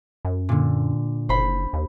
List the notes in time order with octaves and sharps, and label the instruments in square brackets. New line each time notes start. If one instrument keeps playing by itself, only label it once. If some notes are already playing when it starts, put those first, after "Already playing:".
[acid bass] F#2
[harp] A#2 D3
[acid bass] F#1 [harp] C5 B5
[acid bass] D#2